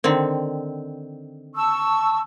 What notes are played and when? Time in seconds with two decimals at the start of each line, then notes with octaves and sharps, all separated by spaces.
0.04 D3 D#3 C4
1.55 A5 C#6 E6